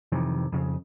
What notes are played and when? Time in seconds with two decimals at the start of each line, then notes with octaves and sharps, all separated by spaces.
0.12 F2 C3 D#3 E3
0.52 F2 C#3